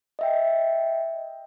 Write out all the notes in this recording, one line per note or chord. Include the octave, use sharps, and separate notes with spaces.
D#5 E5 G5